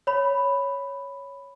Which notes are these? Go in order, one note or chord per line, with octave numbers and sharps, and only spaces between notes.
C#5 B5